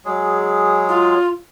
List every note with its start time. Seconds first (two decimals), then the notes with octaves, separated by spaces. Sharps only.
0.05 F#3 G#3 G#4
0.89 F4